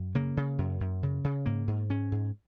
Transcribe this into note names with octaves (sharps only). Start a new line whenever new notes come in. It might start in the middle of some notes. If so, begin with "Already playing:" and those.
Already playing: F#2
C#3 A#3
C#3
F#2
F#2
C#3
C#3
G#2 A#3
G#2
G#2 C#4
G#2